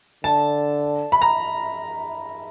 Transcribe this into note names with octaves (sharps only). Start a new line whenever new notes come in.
D3 A5
B5
A#5